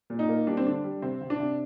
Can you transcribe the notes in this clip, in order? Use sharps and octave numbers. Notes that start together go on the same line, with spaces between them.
A#2
D#4
A#3
G3 D4
C4
D3 D4
G3
C3 C4
C3
D4
C3